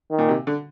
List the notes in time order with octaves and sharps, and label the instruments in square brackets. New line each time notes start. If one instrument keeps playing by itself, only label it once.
[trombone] D#3
[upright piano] A#2
C3
D3